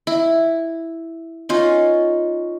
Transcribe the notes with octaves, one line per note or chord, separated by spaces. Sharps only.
E4
C#4 D#4 F4